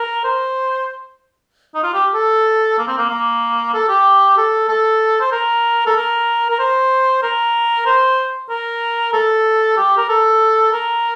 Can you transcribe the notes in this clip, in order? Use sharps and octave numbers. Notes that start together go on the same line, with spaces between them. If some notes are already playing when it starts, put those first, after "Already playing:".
Already playing: A#4
C5
D#4
F4
G4
A4
A#3
C4
A#3
A#3
A4
G4
A4
A4
C5
A#4
A4
A#4
A#4
C5
A#4
C5
A#4
A4
G4
A#4
A4
A#4